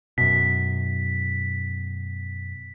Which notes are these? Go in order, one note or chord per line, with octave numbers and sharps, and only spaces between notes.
F#2 B2 B6